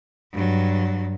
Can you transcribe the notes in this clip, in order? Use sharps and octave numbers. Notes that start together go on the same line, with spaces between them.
G2 F#3